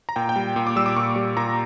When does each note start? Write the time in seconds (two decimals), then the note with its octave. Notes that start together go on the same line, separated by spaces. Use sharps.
0.09 A#5
0.16 A#2 G5
0.29 G5
0.36 G3
0.56 A#2
0.67 D6
0.76 G3 E6
0.86 D6
0.96 A#2 C#6
1.16 G3
1.37 A#2 A#5